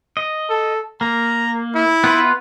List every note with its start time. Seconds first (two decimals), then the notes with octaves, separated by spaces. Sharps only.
0.17 D#5
0.50 A4
1.01 A#3 A#5
1.75 E4
2.04 B3 F4 B4